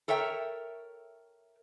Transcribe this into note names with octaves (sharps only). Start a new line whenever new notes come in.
A4 A#4 C#5 E5 G5